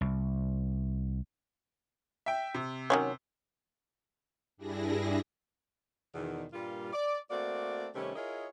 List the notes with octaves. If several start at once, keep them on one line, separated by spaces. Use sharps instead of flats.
C2
E5 G5
C3
D#3 F#3 C#4
G2 G3 D4 E4 G#4 A#6
E2 B2 D#3
G2 A#2 G3 A#3 F4
D5
A3 A#3 C4 F#4 D5
C3 D#3 G3 A3 C#4
E4 F4 G#4 A#4 C#5 D#5